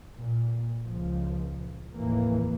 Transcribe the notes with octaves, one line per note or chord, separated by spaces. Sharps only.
A#2
C#2 A#2 F3
F1 D#2 A2 E3 A#3